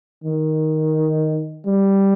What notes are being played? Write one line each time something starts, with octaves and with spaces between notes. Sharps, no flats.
D#3
G3